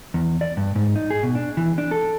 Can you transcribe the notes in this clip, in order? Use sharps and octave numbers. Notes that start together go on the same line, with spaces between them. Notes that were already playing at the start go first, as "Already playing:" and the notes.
E2
D5
G2
G#2
D#4
G#4
B2
D4
E3
D4
A4